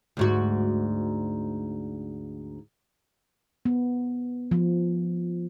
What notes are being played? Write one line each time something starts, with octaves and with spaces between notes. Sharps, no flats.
D2 G#2 F#4
B3
F3